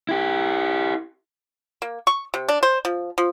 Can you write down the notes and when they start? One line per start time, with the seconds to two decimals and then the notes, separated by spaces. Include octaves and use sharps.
0.09 E4 G4
1.82 A#3
2.07 C#6
2.34 C3
2.48 D4
2.63 C5
2.85 F3
3.18 F3